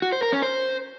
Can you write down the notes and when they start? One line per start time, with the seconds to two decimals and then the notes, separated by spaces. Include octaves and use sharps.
0.02 F#4
0.12 C5
0.22 A#4
0.32 C#4
0.43 C5